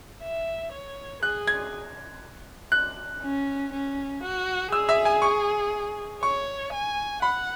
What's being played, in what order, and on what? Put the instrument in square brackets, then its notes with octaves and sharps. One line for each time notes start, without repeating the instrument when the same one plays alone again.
[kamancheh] E5
C#5
[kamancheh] G#4 [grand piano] F#6
[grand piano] G#6
F#6
[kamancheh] C#4
C#4
F#4
[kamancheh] G#4 [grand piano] E6
[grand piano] E5
G#5
C#6
[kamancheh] C#5 [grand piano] C#6
[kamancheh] G#5
[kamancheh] F#5 [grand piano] B5